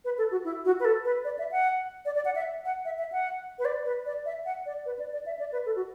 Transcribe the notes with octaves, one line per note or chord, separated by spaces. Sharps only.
B4
A4
F#4
E4
F#4
B4
A4
B4
D5
E5
F#5
D5
D5
F#5
E5
F#5
E5
E5
F#5
B4
D5
B4
D5
E5
F#5
D5
B4
D5
D5
E5
D5
B4
A4
F#4